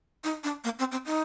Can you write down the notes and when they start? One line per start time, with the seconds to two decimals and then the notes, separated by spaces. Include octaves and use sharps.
0.24 D#4
0.44 D4
0.64 A#3
0.79 C4
0.92 C4
1.06 D#4